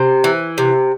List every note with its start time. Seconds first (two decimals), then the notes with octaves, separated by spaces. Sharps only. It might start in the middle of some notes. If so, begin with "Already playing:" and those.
Already playing: C3 C5
0.24 E3
0.58 C3